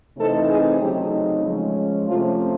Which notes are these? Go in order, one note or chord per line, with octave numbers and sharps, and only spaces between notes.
C3 E3 A3 C4 D#4 A4
G#4
C#3 F#3 A3 C4 D#4 G4
F3 G#3 C#4
C3 F3 A3 C#4 F4